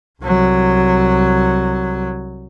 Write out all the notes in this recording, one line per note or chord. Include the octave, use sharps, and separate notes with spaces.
C2 F#3